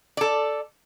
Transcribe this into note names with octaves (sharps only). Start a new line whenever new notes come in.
A4 D5